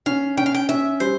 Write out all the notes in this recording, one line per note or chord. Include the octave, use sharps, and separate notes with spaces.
C#4 F5
C#4 G5
F5
G5
C#4 E5
G3 C5